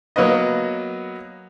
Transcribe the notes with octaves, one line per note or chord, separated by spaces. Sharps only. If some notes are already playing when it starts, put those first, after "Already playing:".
F#3 A#3 B3 B4 D#5